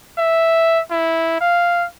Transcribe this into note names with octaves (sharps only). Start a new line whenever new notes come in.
E5
E4
F5